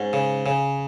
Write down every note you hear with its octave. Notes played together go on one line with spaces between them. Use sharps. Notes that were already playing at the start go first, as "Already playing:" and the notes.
Already playing: G#2 C#4
C#3
C#3